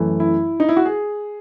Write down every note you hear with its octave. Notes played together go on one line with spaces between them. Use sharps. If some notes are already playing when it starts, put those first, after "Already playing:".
Already playing: F#2 E3 A3
E4
D#4
E4
F#4
G#4